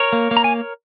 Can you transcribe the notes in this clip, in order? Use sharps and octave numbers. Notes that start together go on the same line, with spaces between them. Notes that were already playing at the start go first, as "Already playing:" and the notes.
Already playing: A#4 C#5
A#3
A#3
A#5
G#5